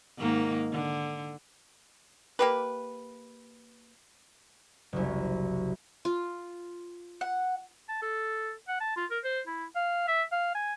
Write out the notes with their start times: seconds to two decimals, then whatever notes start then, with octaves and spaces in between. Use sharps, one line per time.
0.18 G#2 D#3 A#3
0.72 D3
2.39 A#3 G4 B4
4.93 F#1 C2
6.05 F4
7.21 F#5
7.89 A5
8.02 A4
8.68 F#5
8.80 A5
8.97 F4
9.11 A#4
9.24 C5
9.47 E4
9.75 F5
10.08 E5
10.32 F5
10.55 G#5